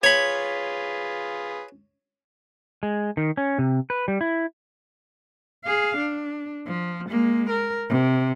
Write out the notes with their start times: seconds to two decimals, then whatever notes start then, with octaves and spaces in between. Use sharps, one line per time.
0.03 F4 G#4 B4 C#5 B5
2.83 G#3
3.17 D#3
3.37 C#4
3.59 C3
3.90 B4
4.08 G3
4.21 E4
5.65 G#4 F5
5.97 D4
6.67 F3
7.09 G#3 A#3
7.50 A#4
7.90 C3